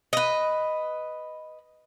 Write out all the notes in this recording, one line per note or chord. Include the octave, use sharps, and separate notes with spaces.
B4 D#5